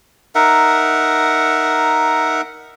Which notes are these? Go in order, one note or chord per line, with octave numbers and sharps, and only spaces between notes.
D#4 A#4 E5 F#5